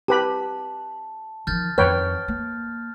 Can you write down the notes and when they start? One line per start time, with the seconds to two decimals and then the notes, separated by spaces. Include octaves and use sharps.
0.08 G4 B4 A5 B5
1.47 D#3 F3 F6 G6 A6
1.78 F2 D#3 B4 C#5 G5 F6
2.28 A#3